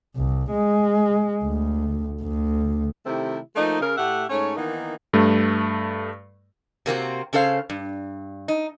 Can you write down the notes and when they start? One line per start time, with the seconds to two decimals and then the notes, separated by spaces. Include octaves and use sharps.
0.16 C2
0.51 G#3
1.44 D2
2.22 D2
3.05 C3 D#3 A3 C4 E4 G4
3.56 F3 A3 A#3 D#4
3.80 C#3 A#4
3.96 A2 A3 G4 E5 F#5
4.29 G#2 A3 C#4 C#5
4.56 D#3 E3 A#3 B3 D#4
5.13 G2 A3
6.86 C3 A#3 C4 F#4
7.33 C#3 C#4 A4 C5 F5
7.70 G2
8.48 D#4